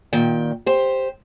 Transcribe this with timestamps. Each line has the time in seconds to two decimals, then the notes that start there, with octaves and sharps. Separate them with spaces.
0.13 A#2 D#3 G5
0.66 G4 C5